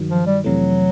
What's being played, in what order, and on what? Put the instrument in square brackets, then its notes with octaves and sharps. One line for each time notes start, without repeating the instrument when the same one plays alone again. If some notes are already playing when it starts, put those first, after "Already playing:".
Already playing: [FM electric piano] G2 D#3 F#3
[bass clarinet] F3
G3
[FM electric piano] F2 C3 E3 A3 [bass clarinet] F#3